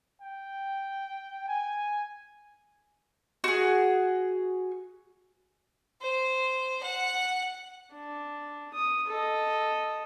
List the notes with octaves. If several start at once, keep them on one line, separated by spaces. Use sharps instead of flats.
G5
G#5
F#4 G#4
C5
F#5
D4
D#6
A4 D#5